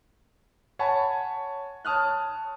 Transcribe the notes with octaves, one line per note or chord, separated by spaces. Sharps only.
C#5 F#5 G#5 A5 B5
C#5 A5 D#6 F6 F#6